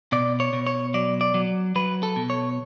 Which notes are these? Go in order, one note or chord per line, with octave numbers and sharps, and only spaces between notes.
B2 D5
C#5
B2
C#5
F#3 D5
D5
F#3
F#3 B4
A4
B2
C#5